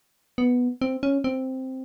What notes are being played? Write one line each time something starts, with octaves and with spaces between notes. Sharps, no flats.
B3
C4
C#4
C4